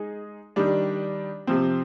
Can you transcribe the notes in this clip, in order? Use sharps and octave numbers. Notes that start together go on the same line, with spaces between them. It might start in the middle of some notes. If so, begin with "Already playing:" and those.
Already playing: G#3 D#4 G#4
D#3 G3 D4
C3 F3 C4